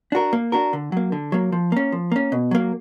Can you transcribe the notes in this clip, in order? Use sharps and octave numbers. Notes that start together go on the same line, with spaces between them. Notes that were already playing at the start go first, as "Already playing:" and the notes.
D4 F#4 A#4
A#3
D4 F#4 A#4
D3
F#3 A#3
D3
F#3 A#3
F3
A#3 C#4
F3
A#3 C#4
B2
F#3 A#3